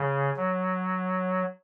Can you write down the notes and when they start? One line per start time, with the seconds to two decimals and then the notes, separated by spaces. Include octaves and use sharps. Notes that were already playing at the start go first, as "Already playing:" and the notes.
Already playing: C#3
0.37 F#3